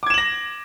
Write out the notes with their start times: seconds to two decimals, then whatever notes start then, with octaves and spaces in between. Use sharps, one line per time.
0.03 D6
0.06 G#6
0.10 E7
0.14 F#7
0.18 A#6